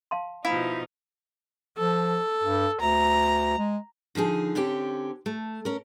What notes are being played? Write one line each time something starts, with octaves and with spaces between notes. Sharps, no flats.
F5 A5 C6
B2 F3 D#4 E4 F5
F3 A4
G2
D2 A#5
G#3
D3 F3 D#4 G#4
D3 C4 C#4 G4
A3
C#4 A#4